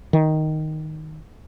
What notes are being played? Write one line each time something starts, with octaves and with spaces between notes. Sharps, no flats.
D#3